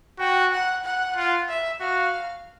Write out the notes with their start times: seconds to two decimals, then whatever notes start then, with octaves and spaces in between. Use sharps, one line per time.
0.19 F#4 G5
0.52 F#5
0.84 F#5
1.16 F4
1.48 E5
1.81 F#4 F5